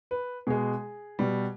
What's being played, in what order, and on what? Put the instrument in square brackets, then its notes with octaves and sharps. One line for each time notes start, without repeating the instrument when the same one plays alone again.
[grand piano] B4
B2 G#3 G#4
B2 G3